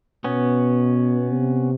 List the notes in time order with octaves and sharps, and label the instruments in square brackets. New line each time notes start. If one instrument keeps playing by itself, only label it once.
[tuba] B2 [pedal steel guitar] B3 C#4
[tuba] C3